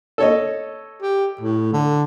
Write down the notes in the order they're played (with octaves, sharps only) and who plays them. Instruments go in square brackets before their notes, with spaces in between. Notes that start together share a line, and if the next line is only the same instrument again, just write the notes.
[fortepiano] A4 C#5 D#5
[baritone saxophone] G4
A2
D3